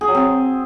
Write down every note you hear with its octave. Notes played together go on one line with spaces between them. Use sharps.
G#4
F#3
C4